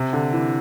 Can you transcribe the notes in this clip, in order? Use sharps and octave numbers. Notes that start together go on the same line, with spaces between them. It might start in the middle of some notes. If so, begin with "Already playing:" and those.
Already playing: C3
D3
E3